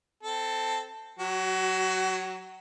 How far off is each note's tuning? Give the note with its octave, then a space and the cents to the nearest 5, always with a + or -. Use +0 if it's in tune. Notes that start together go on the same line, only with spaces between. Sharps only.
C4 -5 A4 +5
F#3 +0 F#4 +30